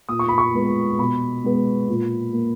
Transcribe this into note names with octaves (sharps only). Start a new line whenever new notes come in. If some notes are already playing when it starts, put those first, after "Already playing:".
A#2 D#6
C#6
B5
C#6
G#3 B3
B2 B5
G#3 B3
A#2
A#3